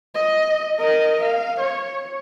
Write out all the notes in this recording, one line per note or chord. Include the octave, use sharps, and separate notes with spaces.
D#5
A#4 D#5
F5
C#5